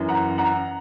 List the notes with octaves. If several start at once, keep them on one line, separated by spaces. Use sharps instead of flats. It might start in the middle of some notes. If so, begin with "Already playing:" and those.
Already playing: F#2 E3
F#5 A#5
F#5 A#5